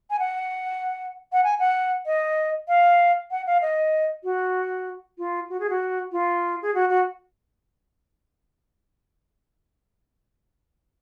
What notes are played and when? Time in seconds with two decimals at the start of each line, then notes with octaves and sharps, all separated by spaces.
0.10 G#5
0.19 F#5
1.33 F#5
1.44 G#5
1.59 F#5
2.06 D#5
2.68 F5
3.31 F#5
3.47 F5
3.62 D#5
4.24 F#4
5.18 F4
5.50 F#4
5.60 G#4
5.70 F#4
6.12 F4
6.62 G#4
6.74 F#4
6.89 F#4